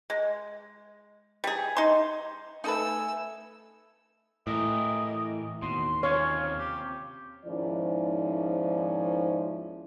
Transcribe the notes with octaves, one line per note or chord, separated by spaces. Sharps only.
G#3
G3 G#4
D#4 C6
A3 D#4 A4 B4 G#5 E6
A2 E3 G4 A#4 D#5
D#2 B2 C6
C3 C#4 F4 C#5 F5
G4
D#2 G#2 F3 C#4 E4 D5